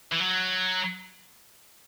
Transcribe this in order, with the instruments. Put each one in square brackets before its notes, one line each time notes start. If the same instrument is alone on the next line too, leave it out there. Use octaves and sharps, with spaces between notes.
[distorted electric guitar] E3
F#3